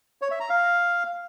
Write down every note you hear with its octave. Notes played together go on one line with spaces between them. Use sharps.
C#5
E5
A#5
F5